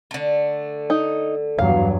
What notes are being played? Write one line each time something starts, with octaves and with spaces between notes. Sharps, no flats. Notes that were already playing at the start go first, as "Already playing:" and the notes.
D3 A3
D#4
E2 G2 F#3 F5